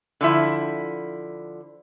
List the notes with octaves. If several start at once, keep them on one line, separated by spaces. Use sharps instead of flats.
D3 F3 E4